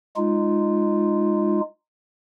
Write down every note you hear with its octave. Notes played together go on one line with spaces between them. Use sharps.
G#3 D#4 F4